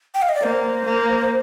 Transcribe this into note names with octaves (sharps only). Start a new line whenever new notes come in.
G5
F5
D#5
D5
A#3 C5
A#3